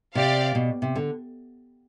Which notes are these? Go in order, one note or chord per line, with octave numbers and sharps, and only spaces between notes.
C3 G4 D5 F5
B2
C3
D3